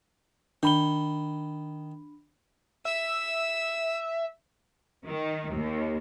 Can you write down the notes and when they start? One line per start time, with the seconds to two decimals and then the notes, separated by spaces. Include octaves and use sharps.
0.63 D#3 D4 B5 G7
2.85 E5 E6
5.07 D#3
5.55 D#2